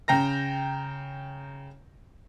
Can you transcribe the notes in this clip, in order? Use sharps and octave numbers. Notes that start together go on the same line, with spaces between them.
C#3 G5 A#5 A#6